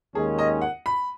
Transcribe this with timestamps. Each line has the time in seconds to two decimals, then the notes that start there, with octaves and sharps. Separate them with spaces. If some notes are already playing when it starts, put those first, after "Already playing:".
0.15 D#2 D#3 G#3 C#4 G#4
0.39 D#5
0.61 F#5
0.86 B5